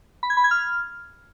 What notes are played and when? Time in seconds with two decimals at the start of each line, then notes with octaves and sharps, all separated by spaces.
0.23 B5
0.30 G#6
0.37 B5
0.44 G#6
0.51 F6